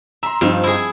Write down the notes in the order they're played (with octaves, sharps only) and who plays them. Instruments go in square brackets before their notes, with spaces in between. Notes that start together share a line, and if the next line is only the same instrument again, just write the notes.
[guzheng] E5 [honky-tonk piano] A#5 C6
[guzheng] G2 [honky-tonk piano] F3 C4 D#4
[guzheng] E4 G#4